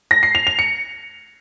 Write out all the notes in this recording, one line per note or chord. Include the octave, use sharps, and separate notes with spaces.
A#6
C7
F7
F7
C#7